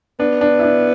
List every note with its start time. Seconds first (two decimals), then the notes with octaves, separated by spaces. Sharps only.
0.20 B3 D4
0.41 D4
0.59 E4
0.63 D4